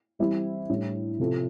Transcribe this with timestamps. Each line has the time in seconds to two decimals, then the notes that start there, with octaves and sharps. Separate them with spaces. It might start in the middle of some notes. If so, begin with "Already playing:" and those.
0.19 E3 G3 C4 E4
0.70 A2 G3 D4
1.19 C3 F3 C4 F4 A4